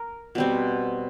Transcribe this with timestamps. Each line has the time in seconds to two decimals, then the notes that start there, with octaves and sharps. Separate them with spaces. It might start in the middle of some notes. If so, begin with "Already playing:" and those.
Already playing: A#4
0.35 B2 G3 C4